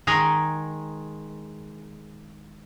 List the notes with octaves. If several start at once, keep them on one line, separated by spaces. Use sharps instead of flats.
D#3 G#3 G#4 D#5 G#5 A#5